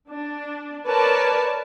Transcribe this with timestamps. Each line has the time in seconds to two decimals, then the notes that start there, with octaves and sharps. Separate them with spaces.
0.11 D4
0.88 A#4 B4 C#5 D5 A5